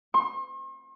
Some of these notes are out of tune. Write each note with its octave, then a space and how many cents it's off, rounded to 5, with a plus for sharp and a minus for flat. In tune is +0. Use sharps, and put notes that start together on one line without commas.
C6 +45